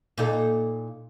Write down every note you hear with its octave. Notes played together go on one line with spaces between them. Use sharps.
A#2 D#4 A4